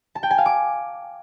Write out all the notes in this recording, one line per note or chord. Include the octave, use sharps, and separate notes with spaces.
A5
G5
G#5
F5
D6